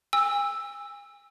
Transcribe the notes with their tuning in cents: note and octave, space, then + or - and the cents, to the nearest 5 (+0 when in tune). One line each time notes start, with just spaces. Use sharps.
G#5 -40 E6 +0